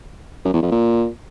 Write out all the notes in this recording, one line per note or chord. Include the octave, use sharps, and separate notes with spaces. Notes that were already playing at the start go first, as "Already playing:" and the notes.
F#2
E2
F2
A#2